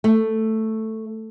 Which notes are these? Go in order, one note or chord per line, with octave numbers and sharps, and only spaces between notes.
A3